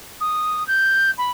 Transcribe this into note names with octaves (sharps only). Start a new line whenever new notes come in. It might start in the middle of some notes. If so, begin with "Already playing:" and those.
D#6
G6
B5